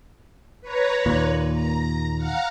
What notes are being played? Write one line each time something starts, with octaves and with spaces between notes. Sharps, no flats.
B4 C#5 A#5
D#2 A#2
A#5
F5 F#5 A#5